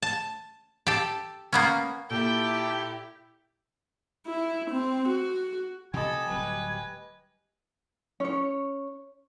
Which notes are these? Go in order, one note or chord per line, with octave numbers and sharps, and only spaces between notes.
A5
G4 A4
A#3 B3 C#4
A#2 E4 G4 A4 G5
E4
C4
F#4
C3 F3 G4 A4 D#5 G5 G#5 B5
D1 F#3 G3 B4
C#4 C#5